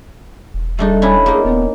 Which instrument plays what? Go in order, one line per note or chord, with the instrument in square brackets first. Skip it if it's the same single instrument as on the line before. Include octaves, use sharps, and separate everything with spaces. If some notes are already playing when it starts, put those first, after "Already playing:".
[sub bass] E1
[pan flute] G3 [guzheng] A3 D4 D#4
[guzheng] C#4 D4 E4
[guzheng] A#3 D#4 [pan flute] G#4
[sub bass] D#1 [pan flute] B3